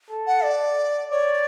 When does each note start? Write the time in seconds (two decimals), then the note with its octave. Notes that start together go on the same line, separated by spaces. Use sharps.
0.11 A4
0.27 F#5
0.44 D5
1.11 C#5 D5